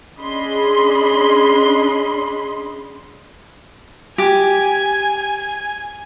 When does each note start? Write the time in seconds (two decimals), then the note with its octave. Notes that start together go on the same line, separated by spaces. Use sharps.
0.19 C#4 D4 G#4 D#5 B5 C6
4.18 G4 G#5